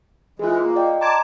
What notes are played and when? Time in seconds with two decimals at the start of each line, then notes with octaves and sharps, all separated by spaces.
0.39 E3 G#3 F4 G#4
0.61 A#3
0.76 D5 D#5 G5
1.01 A5 A#5 C6 D6 G#6